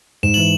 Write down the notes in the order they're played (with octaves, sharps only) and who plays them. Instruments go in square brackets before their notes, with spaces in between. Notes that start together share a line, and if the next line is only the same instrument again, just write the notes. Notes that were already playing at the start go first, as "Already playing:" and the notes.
[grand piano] G#2 [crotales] E7
[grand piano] E3 [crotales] F#7